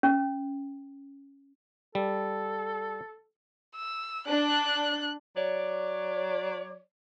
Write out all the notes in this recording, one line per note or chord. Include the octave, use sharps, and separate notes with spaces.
C#4
G3 A4
E6
D4 F#6
F#3 C#5 D5